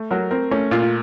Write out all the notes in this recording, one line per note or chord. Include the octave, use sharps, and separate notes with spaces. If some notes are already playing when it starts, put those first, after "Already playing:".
Already playing: A3
F#3 A#4
C4 A#4
A3 C#4
A#2 F4
F4